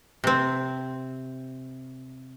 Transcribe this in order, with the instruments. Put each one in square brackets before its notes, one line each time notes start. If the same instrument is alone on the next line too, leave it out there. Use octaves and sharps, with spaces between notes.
[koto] C3 C4